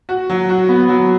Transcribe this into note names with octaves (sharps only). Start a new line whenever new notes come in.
F#4
F#3
F#4
B3
F#3